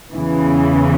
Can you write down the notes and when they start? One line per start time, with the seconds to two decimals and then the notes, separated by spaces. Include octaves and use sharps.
0.12 E2 C#3 E3